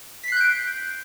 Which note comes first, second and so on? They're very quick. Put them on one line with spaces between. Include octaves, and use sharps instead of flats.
B6 C7 F#6 G6 D7